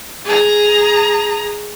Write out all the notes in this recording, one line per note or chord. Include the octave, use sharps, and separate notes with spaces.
G#4 A#5